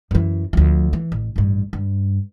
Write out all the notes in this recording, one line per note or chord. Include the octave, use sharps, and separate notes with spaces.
F#2 E3
D2 F3
E3
A1
A1 G2
G2